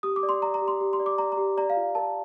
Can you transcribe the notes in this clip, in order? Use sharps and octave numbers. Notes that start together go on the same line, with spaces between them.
G4 D#6
D6
D5
C6
D5 A#5
A#5
G4
C6
G4
C6
D5
D6
D5 A#5
A#5
G4
D5 A#5
F5
F4
A#4 A5